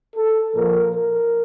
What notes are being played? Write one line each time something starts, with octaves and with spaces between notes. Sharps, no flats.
A4
A#2 F3 A#4
A#4